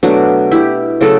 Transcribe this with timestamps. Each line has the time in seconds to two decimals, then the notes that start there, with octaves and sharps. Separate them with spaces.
0.03 B2 F#3 A3 D4 F#4
0.51 E4 G4
1.01 C#3 F#3 A3 F#4 A4